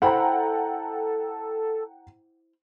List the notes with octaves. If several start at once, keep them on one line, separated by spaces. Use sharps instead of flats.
E4 A4 C5 F#5 G5 A#5 B5